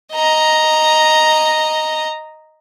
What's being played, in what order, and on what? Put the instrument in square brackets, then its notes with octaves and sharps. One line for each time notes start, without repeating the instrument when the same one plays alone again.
[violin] D#5 A#5